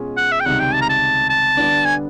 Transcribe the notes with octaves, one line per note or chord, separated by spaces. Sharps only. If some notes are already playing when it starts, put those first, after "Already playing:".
Already playing: B2 G#3 C#4 F4 G#4
F#5
E5
G5
C#2 C3 D#3 G3 F#5
G5
A5
A#5
A5
A5
D3 G3 B3 D4
G#5